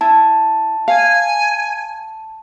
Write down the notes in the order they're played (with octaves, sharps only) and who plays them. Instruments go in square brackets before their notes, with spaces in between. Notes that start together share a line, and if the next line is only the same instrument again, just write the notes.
[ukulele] E4 [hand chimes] A5
[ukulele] F5 [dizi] G#5